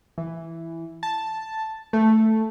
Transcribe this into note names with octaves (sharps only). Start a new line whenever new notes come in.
E3
A5
A3